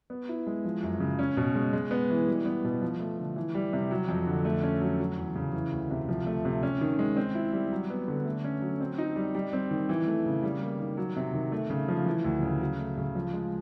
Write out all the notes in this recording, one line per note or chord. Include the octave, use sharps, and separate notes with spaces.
B3
E4
G#3
F3
F#2
C#3
C#4
B2
G#3
G#3
B3
E3
G3
B3
B2
F3
A3
D3
E3
G3
C3
F#3
F2
D3
A3
C#4
F#3
F#3
E2
C#3
E3
D2
C3
F3
A3
C3
C#4
D#3
G#3
C4
E4
G3
F#3
B3
D3
A3
C#4
F#3
C4
D#4
G3
G3
C4
D#3
E3
A3
C#3
G3
A#3
D#3
F#3
C3
D#3
A3
C#3
F3
E3
D2
C#3
F#3
A3
C#3
F3
G#3